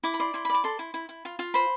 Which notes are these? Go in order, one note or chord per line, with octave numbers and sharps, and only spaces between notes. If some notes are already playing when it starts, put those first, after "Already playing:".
E4 D6
B5
D5 C6
E4 C6
B5
D5 D6
A4 C6
E4
E4
E4
F4
F4
C5 B5